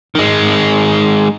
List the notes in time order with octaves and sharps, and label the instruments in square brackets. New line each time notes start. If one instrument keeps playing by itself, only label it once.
[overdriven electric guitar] D#3 G#3